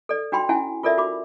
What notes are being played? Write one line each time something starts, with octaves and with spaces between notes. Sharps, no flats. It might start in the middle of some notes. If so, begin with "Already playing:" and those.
A4 D5
D4 F#4 G5 B5 C6
C#4 E4 F5 G#5
F4 A4 A#4 D5 E5
F#4 B5 D6